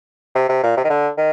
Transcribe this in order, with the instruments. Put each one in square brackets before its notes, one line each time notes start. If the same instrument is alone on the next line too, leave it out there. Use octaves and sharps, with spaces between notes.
[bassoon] C3
C3
A#2
C3
D#3
D3
D#3